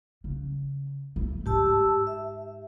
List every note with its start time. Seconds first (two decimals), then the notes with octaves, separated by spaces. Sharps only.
0.24 C#3
1.16 A3
1.46 G#2 G4 A5 E6
2.07 E5